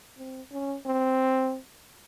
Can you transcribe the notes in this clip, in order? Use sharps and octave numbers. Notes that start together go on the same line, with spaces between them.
C4
C#4
C4